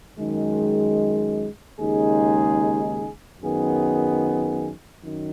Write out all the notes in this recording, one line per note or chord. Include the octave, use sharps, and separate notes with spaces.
F#2 D#3 G#3
D#2 C#3 G#3 D#4 G#4
F#2 D#3 B3 G#4
F#2 D#3